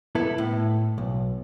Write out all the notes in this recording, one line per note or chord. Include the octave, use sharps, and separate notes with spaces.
B3 E4 A4
A2
B1